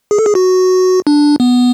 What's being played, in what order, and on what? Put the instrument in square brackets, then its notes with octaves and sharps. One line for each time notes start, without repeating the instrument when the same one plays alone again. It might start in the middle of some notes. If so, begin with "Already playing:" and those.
[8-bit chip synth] G#4
A4
G#4
F#4
D4
B3